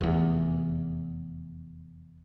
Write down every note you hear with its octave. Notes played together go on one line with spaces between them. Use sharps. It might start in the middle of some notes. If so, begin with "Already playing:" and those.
F1 E2